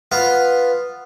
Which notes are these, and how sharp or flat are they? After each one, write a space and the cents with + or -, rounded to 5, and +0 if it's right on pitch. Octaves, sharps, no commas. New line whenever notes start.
B3 +0 F4 +0